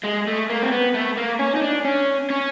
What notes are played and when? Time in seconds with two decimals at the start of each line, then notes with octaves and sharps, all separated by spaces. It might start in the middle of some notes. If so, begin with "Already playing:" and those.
0.04 G#3
0.28 A3
0.50 A#3
0.62 C4
0.72 B3
0.94 A3
1.17 A#3
1.39 C#4
1.55 D#4
1.62 D4
1.85 C#4
2.30 C#4